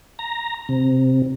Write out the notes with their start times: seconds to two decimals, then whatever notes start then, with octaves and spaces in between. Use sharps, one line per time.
0.19 A#5
0.69 C3